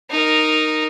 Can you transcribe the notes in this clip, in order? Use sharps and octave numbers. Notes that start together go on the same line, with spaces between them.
D#4 A#4